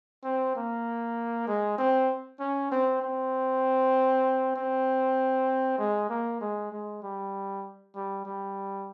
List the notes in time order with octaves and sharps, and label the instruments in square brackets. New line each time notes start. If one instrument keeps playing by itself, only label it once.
[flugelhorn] C4
A#3
G#3
C4
C#4
C4
C4
C4
G#3
A#3
G#3
G#3
G3
G3
G3